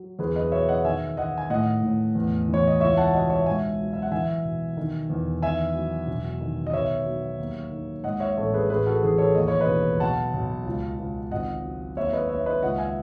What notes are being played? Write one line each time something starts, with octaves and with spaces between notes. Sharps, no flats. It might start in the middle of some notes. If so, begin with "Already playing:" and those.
Already playing: F#3
E2 G#4 B4
B4 D#5
B2 C#5 E5
D#5 F#5
D#3 E5 G#5
D#3 D#5 F#5
G#5
A2 D#5 F#5
A2
E2
E3
C#5
D#5
C#2 C#5 E5
F#5 A5
B2 D#5 F#5
C#5 E5
G#2 E5 G#5
F#3
E5
F#5
E3 E5 G#5
B1
D#3
E2
D#3 E5 G#5
F#3
E1
D#3
D#5
B1 C#5 E5
F#3
D#2
D#3
G#2 D#5 F#5
C#5 E5
A1 A4 C#5
G#4 B4
A1 G#4 B4
F#4 A4
E3 G#4 B4
A4 C#5
D#2 D#5
C#5
B4 D#5
E1
B1 F#5 A5
B1
C#2
C#2
G#1 D#5 F#5
F#3
D#2 C#5 E5
B4 D#5
D#2 C#5 E5
E5
B4 D#5
C#2 D#5 F#5
E5 G#5